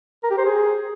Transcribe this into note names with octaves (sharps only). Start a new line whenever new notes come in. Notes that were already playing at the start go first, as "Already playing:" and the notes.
A#4
G4
C5
G#4